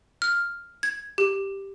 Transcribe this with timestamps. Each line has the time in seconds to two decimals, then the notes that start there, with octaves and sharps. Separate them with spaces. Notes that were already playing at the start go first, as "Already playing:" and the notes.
0.22 F6
0.83 G#6
1.18 G4